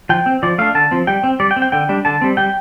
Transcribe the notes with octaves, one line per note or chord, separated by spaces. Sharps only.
F3 G5
C4
F3 D5
A3 D4 F5
D3 A5
F3 C4
G3 G5
C4
G3 D5
G5
C4
G5
D3 G5
G3 D4
D3 A5
G3 C4
G3 G5